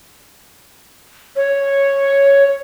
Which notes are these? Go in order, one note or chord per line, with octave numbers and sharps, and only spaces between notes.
C#5